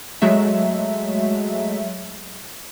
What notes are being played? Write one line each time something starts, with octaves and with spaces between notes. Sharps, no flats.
F#3 G#3 A3 E5